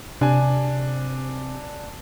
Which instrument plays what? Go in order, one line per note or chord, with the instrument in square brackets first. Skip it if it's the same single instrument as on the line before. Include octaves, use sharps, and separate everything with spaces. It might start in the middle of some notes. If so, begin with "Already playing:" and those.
[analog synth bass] C3 [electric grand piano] D4 G#5